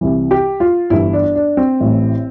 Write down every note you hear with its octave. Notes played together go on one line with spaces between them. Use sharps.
C2 C3 E3
G4
F4
G1 G2 E3 E4
D4
D4
C4
A1 A2 E3